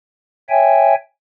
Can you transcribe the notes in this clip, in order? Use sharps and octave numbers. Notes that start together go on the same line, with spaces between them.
C#5 E5 G5 G#5